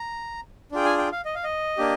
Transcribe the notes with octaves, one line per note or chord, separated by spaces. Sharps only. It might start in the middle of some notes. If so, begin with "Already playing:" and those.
Already playing: A#5
D4 F4 G#4 G5
G#5
G5
F5
D#5
F5
D#5
A#3 D4 G4